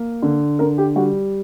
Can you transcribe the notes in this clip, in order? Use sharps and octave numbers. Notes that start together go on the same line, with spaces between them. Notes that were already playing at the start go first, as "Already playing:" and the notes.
Already playing: A#3
D3
D3 A#4
G4
G3 F#4